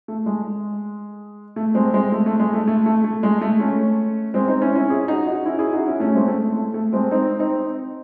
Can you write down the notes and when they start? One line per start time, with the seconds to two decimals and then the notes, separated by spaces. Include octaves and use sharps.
0.08 A3
0.26 G#3
1.56 A3
1.75 G#3 C4
1.93 G#3 C4
2.12 A3
2.26 A3
2.40 G#3
2.54 A3
2.68 A3
2.86 A3
3.04 A3
3.23 G#3
3.41 A3
3.60 A3 C#4
4.34 G#3 C4
4.48 C4 D#4
4.62 C#4 E4
4.75 C#4 E4
4.90 E4 G#4
5.08 D#4 F#4
5.27 D#4 F#4
5.45 C#4 E4
5.59 E4 G#4
5.73 D#4 F#4
5.86 C#4 E4
6.00 A3 C#4
6.15 G#3 C4
6.28 A3
6.56 A3
6.74 A3
6.93 G#3 C4
7.11 C4 D#4
7.39 C4 D#4